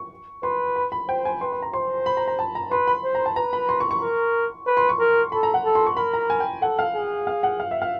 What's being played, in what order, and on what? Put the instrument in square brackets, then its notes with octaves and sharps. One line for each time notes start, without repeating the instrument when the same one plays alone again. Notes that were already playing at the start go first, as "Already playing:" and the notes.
Already playing: [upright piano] C#6
[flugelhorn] B4 [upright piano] C6
[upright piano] B5
B5
[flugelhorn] C5 [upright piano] G5
[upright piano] G#5
[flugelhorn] B4 [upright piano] C6
[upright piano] C6
A#5
[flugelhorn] C5 [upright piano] C6
[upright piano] B5
A#5
A#5
A5
A#5
[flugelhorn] B4 [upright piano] C6
[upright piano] B5
[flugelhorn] C5
[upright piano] A#5
A5
[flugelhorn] B4 [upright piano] A#5
[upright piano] B5
C6
C#6
C#6
[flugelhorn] A#4
B4
[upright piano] C6
C#6
[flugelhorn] A#4
[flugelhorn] A4 [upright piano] B5
[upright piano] A#5
F#5
[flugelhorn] A4
[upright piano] C6
C#6
[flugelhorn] A#4 [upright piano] B5
[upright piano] A#5
G#5
G5
[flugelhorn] A4 [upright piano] F#5
[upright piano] F5
[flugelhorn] G#4
[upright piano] F5
F#5
F5
E5
F5